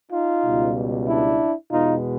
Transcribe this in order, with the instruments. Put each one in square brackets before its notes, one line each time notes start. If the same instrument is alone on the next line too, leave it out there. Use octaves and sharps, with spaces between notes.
[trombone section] D#4 F4
C#2 B2 G3
D4 E4
E2 B2 G#3 B3 D#4 F4